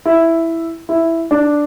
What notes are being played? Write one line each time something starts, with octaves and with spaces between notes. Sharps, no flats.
E4
E4
D4